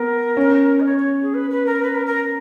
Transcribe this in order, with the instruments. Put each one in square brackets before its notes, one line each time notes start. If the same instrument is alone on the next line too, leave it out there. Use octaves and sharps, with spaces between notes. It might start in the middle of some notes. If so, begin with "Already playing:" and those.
Already playing: [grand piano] B3 [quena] A#4
[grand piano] C#4
[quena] D#5
C#5
C#5
G#4
B4
B4
A#4
B4
A#4
A#4